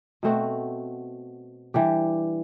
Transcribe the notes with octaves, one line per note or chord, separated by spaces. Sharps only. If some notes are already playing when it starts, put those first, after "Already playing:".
B2 A3 C4 F#4
E3 G3 D4 G4